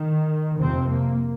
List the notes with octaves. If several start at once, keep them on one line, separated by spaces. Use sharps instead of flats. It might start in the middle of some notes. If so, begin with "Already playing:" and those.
Already playing: D#3
F2 C3 C4
A#3